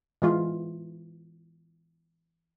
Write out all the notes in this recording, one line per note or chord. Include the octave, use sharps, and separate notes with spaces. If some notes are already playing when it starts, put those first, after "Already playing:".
E3 G#3 F4